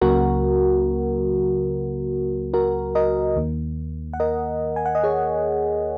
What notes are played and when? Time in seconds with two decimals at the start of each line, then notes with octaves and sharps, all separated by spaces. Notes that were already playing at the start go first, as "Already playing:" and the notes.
0.01 C#2 C#3 F#3 A#3 F#4 A#4
2.54 F#4 A#4
2.95 A#4 D#5
3.36 D#2 D#3 A#3
4.13 F#5
4.20 A#4 D#5
4.76 G#5
4.86 F#5
4.95 D#5
5.04 G#4 C#5